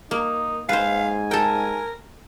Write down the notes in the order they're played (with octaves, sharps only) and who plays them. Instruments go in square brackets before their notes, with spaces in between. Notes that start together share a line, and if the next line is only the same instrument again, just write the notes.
[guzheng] A#3 [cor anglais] D#4
[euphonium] G#2 [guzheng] B4 C5 [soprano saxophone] F5 [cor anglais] G#5
[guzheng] A4 G5 [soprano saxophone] A#4